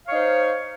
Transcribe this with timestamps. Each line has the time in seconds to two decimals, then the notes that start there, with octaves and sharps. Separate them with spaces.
0.06 F5
0.09 C#5
0.11 D#4
0.14 C5